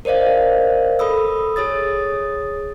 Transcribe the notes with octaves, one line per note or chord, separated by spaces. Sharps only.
A#4 C5 D5 D#5 F5
A4 B5 D#6 E6
G#4 C#5 D#6 A6